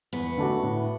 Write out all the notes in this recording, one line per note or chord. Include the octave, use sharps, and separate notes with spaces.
E2 B3
D3 A3 D4 F#4
A2